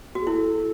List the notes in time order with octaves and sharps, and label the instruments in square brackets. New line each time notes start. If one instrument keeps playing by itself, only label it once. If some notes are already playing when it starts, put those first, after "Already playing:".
[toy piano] F#4 [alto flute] G#4
[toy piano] E4 [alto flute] A4